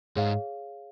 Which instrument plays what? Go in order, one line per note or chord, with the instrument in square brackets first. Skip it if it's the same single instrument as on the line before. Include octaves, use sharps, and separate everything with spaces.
[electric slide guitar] G#2 [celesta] G#4 C#5 F5